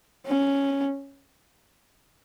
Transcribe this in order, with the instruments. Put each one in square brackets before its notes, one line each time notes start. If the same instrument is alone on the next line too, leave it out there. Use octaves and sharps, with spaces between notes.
[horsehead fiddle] C#4